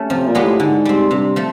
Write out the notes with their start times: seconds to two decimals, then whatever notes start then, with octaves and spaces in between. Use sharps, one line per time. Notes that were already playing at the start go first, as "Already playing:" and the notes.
Already playing: A3 C#4
0.10 C3 F3
0.26 A#2
0.35 G#3 B3 D#4 G4
0.43 A2
0.60 G#2 D3
0.85 G3 C4
1.11 G2 C3
1.36 F3 A3